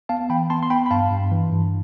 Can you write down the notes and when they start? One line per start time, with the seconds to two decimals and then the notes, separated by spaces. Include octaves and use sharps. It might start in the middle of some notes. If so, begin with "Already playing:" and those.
0.09 B3 F5 A5
0.30 E3 G5 B5
0.50 B3 A5 C6
0.63 C6
0.70 B3 G5 B5
0.86 B5
0.91 G2 F5 A5
1.11 G2
1.32 E3
1.52 G2